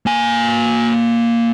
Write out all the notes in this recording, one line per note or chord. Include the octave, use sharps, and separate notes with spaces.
A#3 G#5